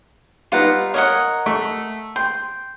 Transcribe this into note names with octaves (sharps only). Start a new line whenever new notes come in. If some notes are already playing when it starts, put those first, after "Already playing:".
G3 B3 D#4 F4 F#5
A#4 C#5 D#5 F#5
A3
G5 C6